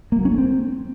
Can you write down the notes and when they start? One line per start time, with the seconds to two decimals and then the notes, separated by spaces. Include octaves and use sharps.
0.12 A#3
0.19 F#3
0.25 C#4
0.31 A3
0.38 C4